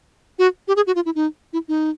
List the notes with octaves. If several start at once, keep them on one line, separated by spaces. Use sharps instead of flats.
F#4
G4
G#4
F#4
F4
E4
D#4
E4
D#4